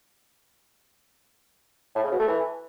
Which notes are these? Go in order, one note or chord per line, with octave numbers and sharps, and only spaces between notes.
A2
C#3
B2
A3
E3